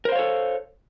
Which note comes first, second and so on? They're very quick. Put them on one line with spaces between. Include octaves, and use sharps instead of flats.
A#4 C5 F5 C#5 A4